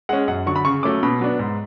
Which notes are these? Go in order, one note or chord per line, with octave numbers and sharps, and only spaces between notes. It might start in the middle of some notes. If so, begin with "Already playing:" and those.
G#3 C#4 F#5
F#2 F#5
D3 F#3 C#6
B5
C#3 C#6
F#3 A3 C#4 D6
B2 B5
F#3 B3 D4
G#2